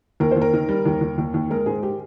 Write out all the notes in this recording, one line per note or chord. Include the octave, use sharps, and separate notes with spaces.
D#2 A#4
D#2 C5
A#4
D#3
G3
D#2
D#2
D#2
D#2
G#3 A#4
G#2 G#4
G4